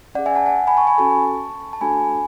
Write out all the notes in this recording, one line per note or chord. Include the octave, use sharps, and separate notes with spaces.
C#4 G#4 D5 F#5
E5 G#5
F#5 A5
F#5 A5
G#5 B5
A5 C#6
G#5 B5
C#4 F#4 A4 A5 C#6
A5
A3 D4 F#4 A4 G#5 B5